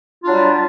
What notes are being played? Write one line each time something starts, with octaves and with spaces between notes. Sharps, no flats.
F#3 G3 D4 F4